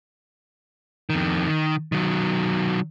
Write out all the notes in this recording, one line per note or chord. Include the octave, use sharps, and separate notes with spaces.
F2 D#3
D#3
D#3 F#3